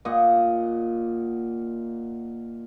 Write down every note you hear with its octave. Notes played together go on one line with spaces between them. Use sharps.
A#2 D#5 F#5